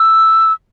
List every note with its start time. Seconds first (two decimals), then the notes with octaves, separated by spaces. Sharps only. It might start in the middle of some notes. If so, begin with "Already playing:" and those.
Already playing: E6